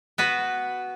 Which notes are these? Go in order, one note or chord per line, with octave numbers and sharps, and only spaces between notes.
B3 F#4 B4